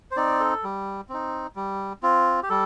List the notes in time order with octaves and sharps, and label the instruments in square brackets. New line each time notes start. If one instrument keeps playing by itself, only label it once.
[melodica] C5
C4 D#4 D5
A4
G3
C4 D#4
G3
C4 F4
G4
G3 A4